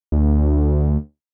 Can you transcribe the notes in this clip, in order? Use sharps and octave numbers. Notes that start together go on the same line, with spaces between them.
D2